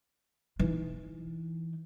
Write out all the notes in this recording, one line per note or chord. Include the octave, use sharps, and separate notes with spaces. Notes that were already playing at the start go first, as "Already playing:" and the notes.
E3 D#4